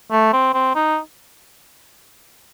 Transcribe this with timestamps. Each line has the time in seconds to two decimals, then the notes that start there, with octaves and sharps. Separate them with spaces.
0.12 A3
0.33 C4
0.54 C4
0.75 D#4